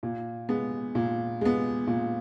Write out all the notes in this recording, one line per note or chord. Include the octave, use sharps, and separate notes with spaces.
A#2
G#3 B3
A#2
G#3 B3
A#2